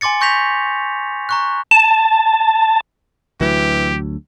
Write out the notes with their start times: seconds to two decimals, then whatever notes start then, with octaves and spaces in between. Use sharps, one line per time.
0.01 G#5 C6 D6 A6 C#7
0.21 C6 C#6 G6 A#6 B6 F7
1.29 A#5 C#6 F#6
1.71 A5
3.41 D2 E3 F#3 G4